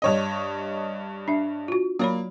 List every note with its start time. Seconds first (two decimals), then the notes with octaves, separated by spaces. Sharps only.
0.02 G2 C#5 D#5
1.28 D4 E5
1.68 F4 F#4
1.99 F#3 A#3 C#5 B5